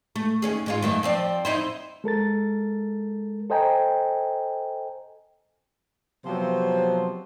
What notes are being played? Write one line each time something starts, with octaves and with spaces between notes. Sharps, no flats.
A3
D#2 C#4 G#4
G#2 G#3 F4
F#2 D#3 A3
F3 C4 D5
D#4 E4 C5
G#3 A4 A#4 A6
A4 C5 D#5 G5 G#5 A#5
C3 F3 F#3 B3 C5